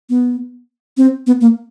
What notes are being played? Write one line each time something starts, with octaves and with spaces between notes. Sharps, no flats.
B3
C4
B3
A#3